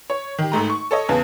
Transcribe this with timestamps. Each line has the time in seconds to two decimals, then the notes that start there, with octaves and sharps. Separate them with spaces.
0.10 C#5
0.38 D#3 G4
0.52 G#1 G#2 A3 A#5
0.70 C#6
0.91 A4 C#5 D#5
1.09 E2 C#3 B3 A5